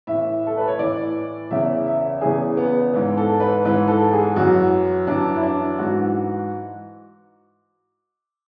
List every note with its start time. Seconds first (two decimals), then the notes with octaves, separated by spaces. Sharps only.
0.07 A2 E3 E5
0.47 A4
0.57 B4
0.67 C#5
0.79 A2 E3 D5
1.51 E2 C#3 E3 E5
1.86 E5
2.21 E2 C#3 E3 G#4
2.57 B3
2.94 G#2 E3
3.17 A4
3.40 B4
3.65 G#2 E3 B4
3.88 A4
4.13 G#4
4.36 F#2 E3 F#4
5.07 F#2 E3 D4
5.35 E4
5.43 D4
5.78 G#2 E3 F#4